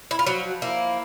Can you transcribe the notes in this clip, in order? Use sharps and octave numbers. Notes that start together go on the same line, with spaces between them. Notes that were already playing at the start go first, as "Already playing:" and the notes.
E4
F4
F3 F#3 F#4
A#3 E4